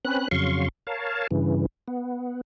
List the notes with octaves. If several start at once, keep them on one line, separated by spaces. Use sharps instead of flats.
C4 C#4 B4 F#6
F2 C#3 F#3 F5 C6 C#6
A#4 C#5 F5 A5
G2 C#3 E3
B3